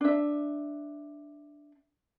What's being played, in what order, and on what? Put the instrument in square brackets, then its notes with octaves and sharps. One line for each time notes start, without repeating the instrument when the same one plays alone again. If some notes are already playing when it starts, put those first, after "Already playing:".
[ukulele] D4 E5